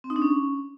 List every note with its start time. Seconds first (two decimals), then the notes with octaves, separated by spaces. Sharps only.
0.04 C4
0.10 D#4
0.16 D4
0.22 C#4